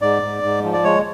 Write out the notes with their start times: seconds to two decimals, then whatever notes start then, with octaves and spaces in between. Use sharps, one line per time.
0.02 G#2 D5
0.22 G#2
0.43 G#2
0.64 F3
0.73 D5
0.84 G#3 C#5